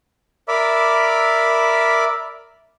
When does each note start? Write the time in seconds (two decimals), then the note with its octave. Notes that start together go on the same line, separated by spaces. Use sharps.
0.48 A#4 D5 E5 B5 D6